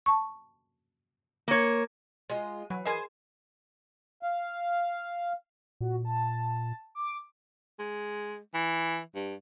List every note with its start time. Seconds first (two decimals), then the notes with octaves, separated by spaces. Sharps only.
0.06 A5 C#6
1.48 A#3 C#5
2.30 G#3 F4 D#5
2.70 E3 F#3
2.85 G#4 A#4 C5 D#5 G#5 C6
4.23 F5
5.81 A#2 F#4
6.05 A5
6.95 D6
7.79 G#3
8.54 E3
9.15 G2